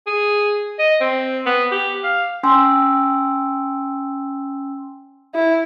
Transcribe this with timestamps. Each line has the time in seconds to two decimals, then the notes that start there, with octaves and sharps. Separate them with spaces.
0.07 G#4
0.79 D#5
1.01 C4
1.46 B3
1.71 G4
2.04 F5
2.43 C#4 G5 G#5 C6 E6
5.35 E4